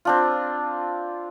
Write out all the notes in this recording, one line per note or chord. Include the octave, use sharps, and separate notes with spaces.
C4 D4 F4